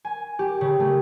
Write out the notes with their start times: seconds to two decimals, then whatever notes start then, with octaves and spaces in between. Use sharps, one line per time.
0.05 G#5
0.39 G4
0.61 C#3
0.80 A3